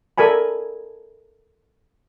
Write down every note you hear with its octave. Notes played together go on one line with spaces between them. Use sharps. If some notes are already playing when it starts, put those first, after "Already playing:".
A4 A#4 D5 G#5 B5